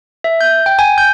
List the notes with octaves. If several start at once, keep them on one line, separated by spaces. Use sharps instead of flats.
E5
G6
G5
G#5
G6